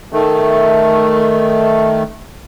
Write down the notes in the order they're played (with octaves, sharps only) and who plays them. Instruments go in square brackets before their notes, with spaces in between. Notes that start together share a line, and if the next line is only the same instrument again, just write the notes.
[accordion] D#3 A3